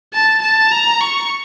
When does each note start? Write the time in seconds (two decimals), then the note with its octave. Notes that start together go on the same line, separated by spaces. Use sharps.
0.13 A5
0.42 A5
0.71 A#5
1.01 C#6